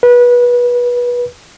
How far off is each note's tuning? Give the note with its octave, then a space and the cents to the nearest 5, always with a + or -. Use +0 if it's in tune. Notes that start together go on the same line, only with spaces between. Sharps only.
B4 -25